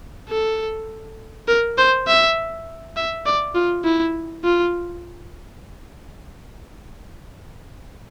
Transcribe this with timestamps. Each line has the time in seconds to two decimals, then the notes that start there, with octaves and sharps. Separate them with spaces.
0.29 A4
1.48 A#4
1.78 C5
2.08 E5
2.97 E5
3.26 D5
3.55 F4
3.84 E4
4.44 F4